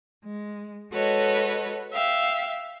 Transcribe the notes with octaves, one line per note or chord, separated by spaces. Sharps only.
G#3
G#3 F#4 A4 B4 C#5 D#5
E5 F5 G5